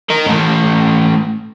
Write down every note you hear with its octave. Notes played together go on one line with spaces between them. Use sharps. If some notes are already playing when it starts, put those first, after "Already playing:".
A#4 D#5
A3 C#4